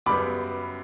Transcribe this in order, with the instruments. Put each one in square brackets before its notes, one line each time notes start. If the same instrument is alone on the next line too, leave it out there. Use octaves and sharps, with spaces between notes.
[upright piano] F#2 C#3 G3 B3 B5 D6